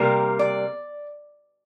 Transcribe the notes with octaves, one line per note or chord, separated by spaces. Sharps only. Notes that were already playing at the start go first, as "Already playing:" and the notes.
Already playing: C3 G3 A#3 A#4
D5